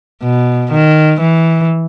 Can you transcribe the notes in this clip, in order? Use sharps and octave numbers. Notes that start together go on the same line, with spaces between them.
B2
D#3
E3